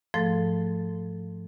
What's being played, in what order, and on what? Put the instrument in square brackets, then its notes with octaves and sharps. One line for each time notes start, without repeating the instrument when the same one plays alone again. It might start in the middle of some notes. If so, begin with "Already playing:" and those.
[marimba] G#2 F3 A3 A4 A6